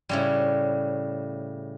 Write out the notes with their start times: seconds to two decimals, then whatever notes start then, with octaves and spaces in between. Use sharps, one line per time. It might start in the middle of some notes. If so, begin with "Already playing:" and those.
0.09 A2 C#3 G3